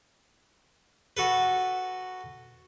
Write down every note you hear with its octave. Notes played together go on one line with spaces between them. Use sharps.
F#4 A4 B4